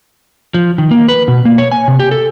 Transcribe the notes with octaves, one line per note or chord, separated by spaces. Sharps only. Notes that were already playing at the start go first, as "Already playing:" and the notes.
F3
D#3
A#3
B4
B2
A#3
C#5
G#5
C3
G4
A4